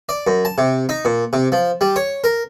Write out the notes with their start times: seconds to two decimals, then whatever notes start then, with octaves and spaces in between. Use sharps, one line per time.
0.09 D5
0.27 F#2
0.45 A5
0.58 C3
0.89 D#4
1.05 A#2
1.33 C3
1.52 F3
1.81 G3
1.96 C#5
2.24 A#4